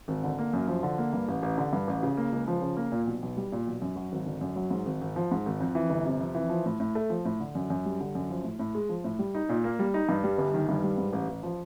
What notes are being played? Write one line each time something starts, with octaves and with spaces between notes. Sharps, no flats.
G#1
D3
A#3
F#2
F3
D3
A#3
G2
A1
A1
D3
G2
A1
C#3
A#3
C#2
F3
C#3
A#3
A#2
B1
B1
G3
A#2
B1
F#2
F#3
G#1
D3
F#2
F#3
G#2
G#1
G#1
F3
G#2
G#1
F2
E3
G1
C3
F2
E3
F3
A2
A2
A3
F3
A2
D3
F#2
F#2
G3
D3
F#2
F3
A2
A2
G#3
F3
A2
G3
D#4
A#2
A#3
G3
D#4
G2
G3
G1
D#3
G2
G3
G#2
A1
A1
F3